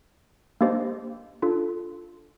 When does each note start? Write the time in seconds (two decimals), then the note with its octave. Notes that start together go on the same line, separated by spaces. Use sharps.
0.61 A#3 D4 G4 C5 D#5
1.42 D4 F4 A4